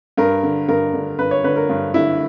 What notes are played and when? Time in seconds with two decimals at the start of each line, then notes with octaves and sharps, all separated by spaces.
0.17 G2 A#4
0.43 D3
0.68 G2 A#4
0.93 D3
1.19 G2 B4
1.31 C#5
1.44 D3 B4
1.56 A#4
1.69 G2
1.94 D3 E4